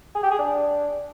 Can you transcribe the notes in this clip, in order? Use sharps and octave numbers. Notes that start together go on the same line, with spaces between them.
G#4
G4
G#4
D4